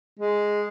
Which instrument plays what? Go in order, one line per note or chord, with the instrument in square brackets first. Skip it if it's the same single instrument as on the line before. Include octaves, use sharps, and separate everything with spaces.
[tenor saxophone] G#3